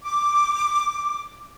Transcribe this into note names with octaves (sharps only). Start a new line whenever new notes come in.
D6